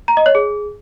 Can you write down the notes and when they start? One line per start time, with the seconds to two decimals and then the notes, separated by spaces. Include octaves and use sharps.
0.08 A#5
0.17 D#5
0.26 C#5
0.35 G#4